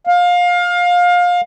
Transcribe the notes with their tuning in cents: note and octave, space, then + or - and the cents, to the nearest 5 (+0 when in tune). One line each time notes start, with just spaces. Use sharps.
F5 +25